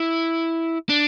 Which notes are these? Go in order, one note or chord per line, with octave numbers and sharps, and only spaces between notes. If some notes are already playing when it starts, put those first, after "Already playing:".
Already playing: E4
D4